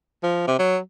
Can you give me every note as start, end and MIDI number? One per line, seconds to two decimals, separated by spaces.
0.23 0.43 53
0.47 0.58 48
0.59 0.78 54